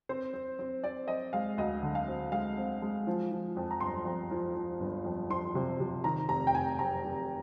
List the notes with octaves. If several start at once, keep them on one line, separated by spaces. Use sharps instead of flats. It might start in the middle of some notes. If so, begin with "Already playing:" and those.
C4 C5
C4
C4
C4 D5
C4 D#5
G#3 F5
D2 D#5
D3
F5
C4
G#3 F5
C4
G#3
F3
F3
F2
A#5
G1 C6
F2
F3
F3
G1
F2
F3 C6
C3
C3
D#3 A#5
F1 A#5
G5
F1 G#5
F1 A#5
F1